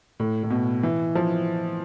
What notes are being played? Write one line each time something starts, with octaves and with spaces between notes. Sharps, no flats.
A2
A2
B2
E3
F3